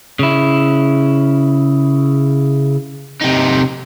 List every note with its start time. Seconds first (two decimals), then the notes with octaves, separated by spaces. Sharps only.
0.19 C#3 E4
3.21 C3 D#4